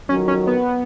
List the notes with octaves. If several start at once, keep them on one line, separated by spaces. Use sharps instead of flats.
F2 D#3 F#3 C#4
C#4
B3